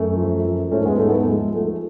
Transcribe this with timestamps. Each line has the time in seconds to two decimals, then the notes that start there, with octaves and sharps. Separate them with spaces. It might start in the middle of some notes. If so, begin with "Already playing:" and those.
Already playing: F#2 A3
0.16 F3
0.44 F3
0.72 G#2 A3 C#4
0.85 G#3 B3
0.99 G#2 A3
1.09 B3
1.14 A3
1.27 F3 G#3
1.55 F3 A3